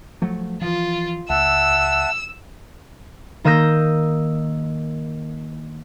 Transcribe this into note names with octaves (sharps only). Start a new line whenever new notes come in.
F3 F#3 A3
E3 F3 F4
C#2 E5 F#5 A5 E6
D#3 A#3 D#6 E6 G6 A#6